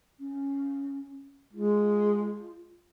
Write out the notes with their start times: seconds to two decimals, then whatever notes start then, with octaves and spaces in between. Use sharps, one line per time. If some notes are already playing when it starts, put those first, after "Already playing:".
0.19 C#4
1.53 G#3 F4